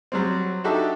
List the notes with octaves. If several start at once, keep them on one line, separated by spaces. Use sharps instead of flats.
F#3 G3 C4
D4 D#4 F#4 G4 A4 E5